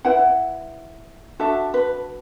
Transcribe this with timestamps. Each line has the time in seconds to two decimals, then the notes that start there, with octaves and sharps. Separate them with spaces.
0.05 E4 B4 F#5
1.39 D4 F#4 A4 E5
1.74 B4